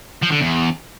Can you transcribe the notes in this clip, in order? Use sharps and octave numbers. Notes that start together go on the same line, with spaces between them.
F3
D3
E2